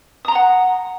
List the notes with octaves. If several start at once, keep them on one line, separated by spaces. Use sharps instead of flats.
F#5 A#5 C6 D#6